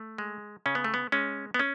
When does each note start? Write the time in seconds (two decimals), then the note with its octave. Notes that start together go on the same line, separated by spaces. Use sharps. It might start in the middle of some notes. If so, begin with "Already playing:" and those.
Already playing: A3
0.18 G#3
0.66 C#3 C#4
0.75 B3
0.84 A3
0.94 B3
1.12 G#3 C#4
1.54 B3
1.59 C#4